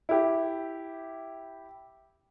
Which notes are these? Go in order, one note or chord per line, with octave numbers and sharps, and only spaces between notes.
E4 G4